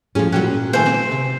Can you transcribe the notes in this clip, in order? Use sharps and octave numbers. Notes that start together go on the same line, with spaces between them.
A2 F3 C#4 G#4
A#2 F#3 G3 C#4 G5 F#6
D#3 A3 A#3 G4 G#4 C5 G#5
C4
C3